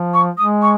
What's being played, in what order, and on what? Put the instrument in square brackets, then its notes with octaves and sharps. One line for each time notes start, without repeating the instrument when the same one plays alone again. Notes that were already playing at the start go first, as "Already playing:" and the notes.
Already playing: [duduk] F3
[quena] C#6
[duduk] G#3 [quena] D#6
[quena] C#6